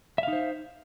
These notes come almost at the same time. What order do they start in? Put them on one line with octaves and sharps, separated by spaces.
E5 F5 D#4 C5